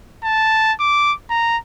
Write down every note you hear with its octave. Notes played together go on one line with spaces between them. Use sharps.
A5
D6
A#5